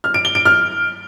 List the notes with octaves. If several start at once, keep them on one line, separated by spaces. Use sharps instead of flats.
F6
D7
G7
D7
F6